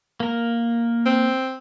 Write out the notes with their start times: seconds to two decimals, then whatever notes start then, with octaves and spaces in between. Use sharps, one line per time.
0.20 A#3 A#4
1.06 C4